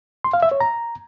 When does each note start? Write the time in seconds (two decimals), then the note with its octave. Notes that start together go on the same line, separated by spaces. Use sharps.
0.24 C6
0.33 F5
0.42 E5
0.51 C#5
0.61 A#5